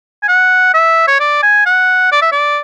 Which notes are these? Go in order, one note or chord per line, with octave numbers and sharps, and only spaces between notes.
G#5
F#5
E5
C#5
D5
G#5
F#5
D5
E5
D5